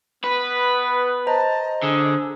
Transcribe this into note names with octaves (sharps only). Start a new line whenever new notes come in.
B3 B4
C5 D#5 A5 A#5
D3 G#4